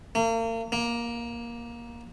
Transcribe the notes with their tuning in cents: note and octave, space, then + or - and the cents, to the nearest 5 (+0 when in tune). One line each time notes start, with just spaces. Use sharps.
A#3 -40
A#3 +15